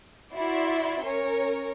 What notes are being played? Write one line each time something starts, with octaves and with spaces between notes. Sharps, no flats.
E4 F#4 D5 E5 C6
C#4 A#4 C#5